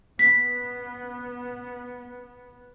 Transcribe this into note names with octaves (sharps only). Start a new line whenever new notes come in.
B3 B6